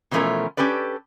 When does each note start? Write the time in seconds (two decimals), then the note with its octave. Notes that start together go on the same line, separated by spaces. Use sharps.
0.11 B2 E3 F3 A3 C#4 A#4
0.57 C#4 G4 A4 B4 D5